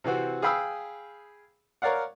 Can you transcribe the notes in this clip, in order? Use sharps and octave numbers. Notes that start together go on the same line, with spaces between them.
C3 E3 C4 F#4
G#4 F5 G5 B5 D#6 E6
A#4 C#5 D5 F5 F#5